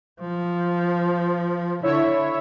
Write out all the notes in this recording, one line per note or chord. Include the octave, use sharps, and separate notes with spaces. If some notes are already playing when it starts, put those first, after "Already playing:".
F3
D3 E4 C#5 E5